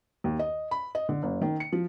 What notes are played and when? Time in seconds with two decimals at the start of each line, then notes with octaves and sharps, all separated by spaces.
0.24 D#2
0.39 D#5
0.71 B5
0.95 D#5
1.09 D3
1.23 F#1
1.42 D#3
1.60 C#7
1.73 F3